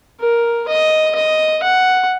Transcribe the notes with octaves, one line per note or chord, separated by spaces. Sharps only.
A#4
D#5
D#5
F#5